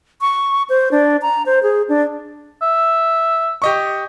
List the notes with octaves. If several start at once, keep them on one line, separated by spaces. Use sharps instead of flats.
C#6
C5
D4
A#5
C5
G#4
D4
E5
G4 D#5 C#6